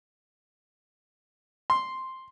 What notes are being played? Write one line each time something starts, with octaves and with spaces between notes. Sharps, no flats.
C6